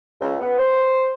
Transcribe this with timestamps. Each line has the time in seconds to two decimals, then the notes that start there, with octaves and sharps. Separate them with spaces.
0.21 C#2
0.40 B3
0.58 C5